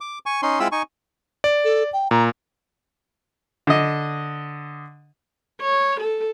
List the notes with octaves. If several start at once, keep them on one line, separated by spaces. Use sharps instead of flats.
D6
G#5 C#6
C#4 D#4 C6
G#3 C4 E4 F4 B5 E6
D#4 G#5 C#6
D5
A4
G5
A#2 A#5
D3 D#5
C#5
A4